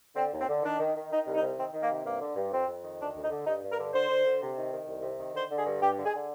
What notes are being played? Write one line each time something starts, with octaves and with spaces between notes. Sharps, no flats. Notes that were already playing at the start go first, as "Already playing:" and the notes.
D3 C4
D#2
C4
D3
D#3 D4
D#3
D#3
D#3 D#4
C2
D#4
C3
D#3 C4
D#3
A#3
C3
G2 A#3
D3
G2
F2 C4
F2
D#3
D2 D4
D2
D#4
D3
G2 D#4
G2
A#4
D3
D3 C5
D3
D3
C3
D#3
D#3
C2
C3
D#3
D3 C5
D3
G#4
G2
G2 G4
D3
G#4
D3